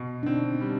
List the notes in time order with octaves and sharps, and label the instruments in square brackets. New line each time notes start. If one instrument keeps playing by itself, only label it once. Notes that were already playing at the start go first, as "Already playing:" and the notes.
Already playing: [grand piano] B2
[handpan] D4
[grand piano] C4 [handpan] D#4
[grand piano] G3